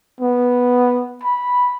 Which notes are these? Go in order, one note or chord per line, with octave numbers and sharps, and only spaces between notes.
B3
B5